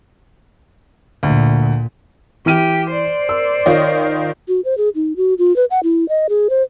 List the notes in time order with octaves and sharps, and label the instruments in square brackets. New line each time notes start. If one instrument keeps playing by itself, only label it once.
[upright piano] D2 [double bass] A#2
[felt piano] E3 F6 D#7 [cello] G4
[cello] C5 D5
[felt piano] A#4 E6
[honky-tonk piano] D#3 F4 D#5 [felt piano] C#5
[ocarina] F#4
C5
G#4
D#4
F#4
F4
B4
F#5
E4
D#5
G#4
C5